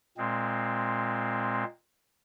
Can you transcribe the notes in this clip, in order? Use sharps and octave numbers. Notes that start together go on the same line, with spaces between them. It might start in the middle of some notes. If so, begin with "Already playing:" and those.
A#2 G#3 C4